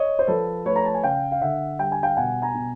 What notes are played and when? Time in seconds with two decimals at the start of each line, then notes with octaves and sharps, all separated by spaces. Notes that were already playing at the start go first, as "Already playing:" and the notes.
Already playing: C#5 D#5
0.19 C5
0.28 F3 A4 B4
0.65 A3 B4 C#5
0.76 A#5
0.85 A5
0.95 G#5
1.03 C#3 F5 G5
1.32 F5
1.41 D3 E5 F#5
1.79 G3 G5
1.92 G#5
2.03 F5 G5
2.17 B2 F#5 G#5
2.42 G#5 A#5
2.55 B2